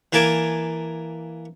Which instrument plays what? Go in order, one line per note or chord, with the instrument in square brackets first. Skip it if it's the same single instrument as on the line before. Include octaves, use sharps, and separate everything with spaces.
[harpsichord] E3 A#3 G#5 A5 D6